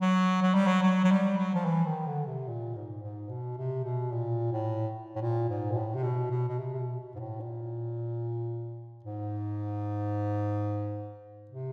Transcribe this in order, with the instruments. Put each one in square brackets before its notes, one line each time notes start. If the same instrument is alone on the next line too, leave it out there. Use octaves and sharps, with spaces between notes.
[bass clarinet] F#3
F#3
G3
F#3
F#3
F#3
G3
F#3
F3
E3
D#3
D3
C3
A#2
G#2
G#2
B2
C3
B2
A#2
A2
A2
A#2
G#2
A#2
A2
C3
B2
B2
B2
C3
C3
B2
B2
G#2
A2
A#2
G#2
C3